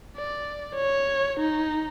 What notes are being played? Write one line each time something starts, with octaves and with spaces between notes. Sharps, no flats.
D5
C#5
D#4